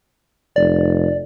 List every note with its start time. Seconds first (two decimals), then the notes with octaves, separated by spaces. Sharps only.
0.56 F1 D5